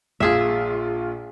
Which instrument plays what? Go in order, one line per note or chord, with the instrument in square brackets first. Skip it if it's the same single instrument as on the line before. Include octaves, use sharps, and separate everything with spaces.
[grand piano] A#1 A#2 F4 [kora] G#4 E5